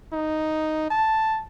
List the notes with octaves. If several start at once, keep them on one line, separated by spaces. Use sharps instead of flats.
D#4
A5